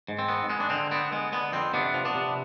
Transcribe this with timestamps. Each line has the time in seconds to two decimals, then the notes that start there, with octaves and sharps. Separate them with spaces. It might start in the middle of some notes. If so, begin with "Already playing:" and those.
0.08 G#2
0.19 C4
0.29 B3
0.49 G#3 B3
0.60 D4
0.70 D3 C4
0.91 B3 C4
1.12 G#3 B3
1.32 D3 B3
1.53 F2 C4
1.73 C3 B3 D4
1.94 F3
2.05 B3 D4
2.15 C3